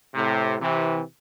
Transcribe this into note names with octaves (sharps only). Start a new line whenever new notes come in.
A2 C3
C3 E3